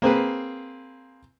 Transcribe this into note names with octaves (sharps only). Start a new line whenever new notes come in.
A#3 C4 G#4 B4